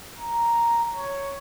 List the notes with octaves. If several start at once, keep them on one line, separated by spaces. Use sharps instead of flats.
A#5
C#5